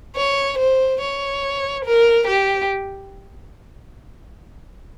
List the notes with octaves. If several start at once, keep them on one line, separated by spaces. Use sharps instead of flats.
C#5
C5
C#5
A#4
G4